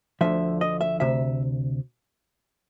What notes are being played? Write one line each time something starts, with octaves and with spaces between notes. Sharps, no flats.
D2 D3 F3 E5
D#5
E5
D2 C3 E5